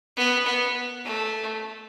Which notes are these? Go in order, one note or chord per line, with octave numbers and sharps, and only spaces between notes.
B3
B3
A3